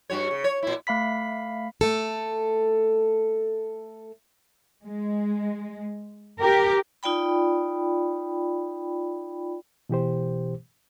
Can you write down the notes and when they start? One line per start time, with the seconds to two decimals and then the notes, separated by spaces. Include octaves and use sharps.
0.10 G2 F#4 C#5
0.31 C#3
0.44 C#5
0.63 A#2 E4
0.87 A3 F5 B5 B6
1.81 A3 A4
4.86 G#3
6.39 G4 A#4
7.03 D#4 F4 D5 G5 B5
9.89 B2 E3 G4 C5